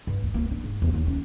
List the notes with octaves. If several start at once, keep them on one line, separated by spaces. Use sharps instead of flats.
G2
D2
A#3
D4
G#2
E2
D#2
C#4